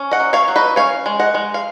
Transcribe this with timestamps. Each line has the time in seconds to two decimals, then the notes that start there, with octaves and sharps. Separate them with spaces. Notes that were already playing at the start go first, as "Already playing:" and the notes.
Already playing: C#4
0.11 D#5 F#5
0.19 F#3
0.33 C#5 F5
0.48 F#3
0.56 B4 D#5
0.76 C#4 C#5 F5
1.06 G#3
1.19 D#5 F#5
1.34 G#3
1.54 F5